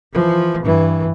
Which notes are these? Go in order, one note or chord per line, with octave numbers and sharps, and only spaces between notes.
E3 F3
G2 E3